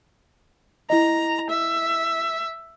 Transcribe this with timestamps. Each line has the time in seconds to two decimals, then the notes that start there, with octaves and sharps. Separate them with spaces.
0.90 E4 D#5 A#5
1.49 E5